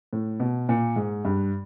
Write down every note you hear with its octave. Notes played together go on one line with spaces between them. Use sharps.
A2
B2
A#2
G#2
G2